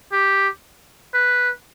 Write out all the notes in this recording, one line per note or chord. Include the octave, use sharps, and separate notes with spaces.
G4
B4